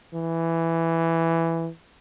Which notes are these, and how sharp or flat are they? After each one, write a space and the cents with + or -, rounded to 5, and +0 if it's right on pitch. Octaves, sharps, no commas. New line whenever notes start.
E3 +5